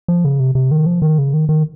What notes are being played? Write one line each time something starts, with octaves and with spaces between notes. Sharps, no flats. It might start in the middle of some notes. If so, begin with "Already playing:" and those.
F3
C#3
C3
C3
D#3
F3
D#3
C#3
D#3
D#3